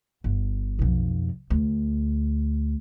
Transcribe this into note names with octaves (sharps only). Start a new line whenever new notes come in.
G1
B1 F2
D2